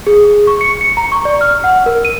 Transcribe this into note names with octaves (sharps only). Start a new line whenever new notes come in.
G#4
C#6
C#7
C#7
A#5
C#6
D5
F6
F#5
A#4
D#7